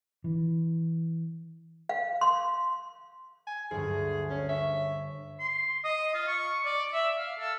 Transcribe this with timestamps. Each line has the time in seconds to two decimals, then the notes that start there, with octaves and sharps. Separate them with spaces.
0.24 E3
1.89 F5
2.21 C6
3.47 G#5
3.71 D2 G2 G#4
4.30 C#4
4.49 C#5 E5
5.40 C6
5.84 D#5
6.14 F4
6.28 C#6
6.65 D5
6.93 E5
7.18 F5
7.39 A4